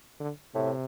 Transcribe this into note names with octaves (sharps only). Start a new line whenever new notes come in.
D3
A2 C3